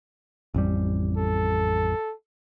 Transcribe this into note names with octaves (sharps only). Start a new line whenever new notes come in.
A1 F2 G3
A4